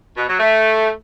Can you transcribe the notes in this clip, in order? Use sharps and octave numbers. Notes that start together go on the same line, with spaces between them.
B2
F#3
A3